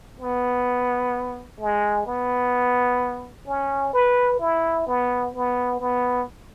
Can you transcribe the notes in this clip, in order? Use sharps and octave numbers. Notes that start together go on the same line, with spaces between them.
B3
G#3
B3
C#4
B4
E4
B3
B3
B3